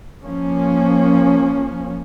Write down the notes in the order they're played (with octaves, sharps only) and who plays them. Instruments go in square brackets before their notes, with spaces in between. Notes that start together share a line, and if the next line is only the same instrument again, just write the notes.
[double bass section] F3 A#3 C#4